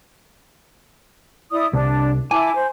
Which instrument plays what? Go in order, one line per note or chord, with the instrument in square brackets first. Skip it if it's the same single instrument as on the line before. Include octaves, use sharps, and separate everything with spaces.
[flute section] E4 D5 D#6
[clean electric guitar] C2 [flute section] D4
[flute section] E4 A5 D6 [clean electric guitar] G#5
[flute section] C5